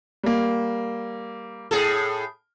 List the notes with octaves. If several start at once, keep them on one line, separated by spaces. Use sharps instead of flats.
G3 A#3
A2 G#4 A4